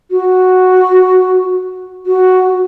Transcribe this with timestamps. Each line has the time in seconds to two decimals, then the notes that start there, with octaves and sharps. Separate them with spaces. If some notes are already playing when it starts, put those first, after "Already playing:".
0.11 F#4
2.06 F#4